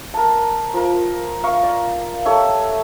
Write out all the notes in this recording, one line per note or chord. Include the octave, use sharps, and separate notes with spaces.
A#4 A5
F3 A#4
A#4 F5 C#6
D5
G4 A4 C#5 E5